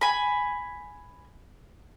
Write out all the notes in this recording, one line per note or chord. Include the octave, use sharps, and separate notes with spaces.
G#5 B5